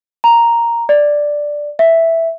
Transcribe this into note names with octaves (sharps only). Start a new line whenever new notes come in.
A#5
D5
E5